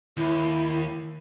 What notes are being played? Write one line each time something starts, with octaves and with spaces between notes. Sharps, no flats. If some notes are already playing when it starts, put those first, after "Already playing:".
D#2 E4